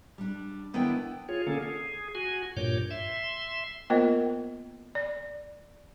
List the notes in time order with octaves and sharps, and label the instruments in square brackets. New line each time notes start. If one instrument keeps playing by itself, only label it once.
[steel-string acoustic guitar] G3 D4
D#3 B3 D4 E4 C#5 G5
[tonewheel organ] F4 G#4 C#5
D3 A#3 C#4 G#4 A4
G#4
F#4 G#5
G2 A#2 C#5 D6 G6
E5 C6
[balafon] A#3 B3 F4 A#4 C5 D#5
D5